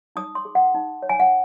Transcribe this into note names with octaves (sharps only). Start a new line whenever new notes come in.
D#4 D#6
C6
G#4
F#5
D#4
C#5
G#5
F#5